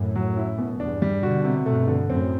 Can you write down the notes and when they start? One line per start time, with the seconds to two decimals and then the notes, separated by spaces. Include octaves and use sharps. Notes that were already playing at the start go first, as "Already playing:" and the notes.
Already playing: F#2 A2
0.16 F#3
0.37 E4
0.59 B2
0.80 E2 G2 D4
1.02 G3
1.22 B2 D3 F#4
1.44 C3
1.66 G2 B2 A3
1.88 D3
2.09 F#2 A2 C4